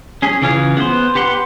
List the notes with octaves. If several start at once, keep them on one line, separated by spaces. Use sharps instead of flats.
C#4 G#4
C#3 E3 F4 G#4 F5
B3 C5
G4 B4 F#5 C6